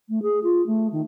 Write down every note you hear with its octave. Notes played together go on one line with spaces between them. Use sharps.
A3
G#4
F4
A3
D#3